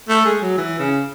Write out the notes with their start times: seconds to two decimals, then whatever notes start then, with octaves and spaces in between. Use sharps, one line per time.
0.09 A3
0.25 G#3
0.42 F#3
0.58 E3
0.79 C#3